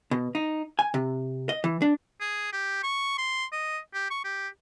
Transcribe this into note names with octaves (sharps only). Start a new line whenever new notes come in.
B2
D#4
G#5
C3
D#5
E3
D4
G#4
G4
C#6
C6
D#5
G4
C#6
G4